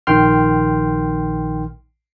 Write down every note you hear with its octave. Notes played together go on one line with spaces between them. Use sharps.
A#1 D#3 G5 C6 F6